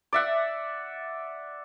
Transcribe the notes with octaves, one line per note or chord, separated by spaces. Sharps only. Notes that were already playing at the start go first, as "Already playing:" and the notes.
D5 E5 F#5